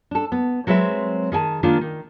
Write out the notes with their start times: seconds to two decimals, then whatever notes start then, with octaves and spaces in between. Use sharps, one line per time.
0.11 D4 A4
0.32 B3
0.67 F#3 G#3 C4 B4 E5
1.32 D#3 G#4 G5 A5
1.63 D#3 G#3 A#3 D4 F4
1.81 D#3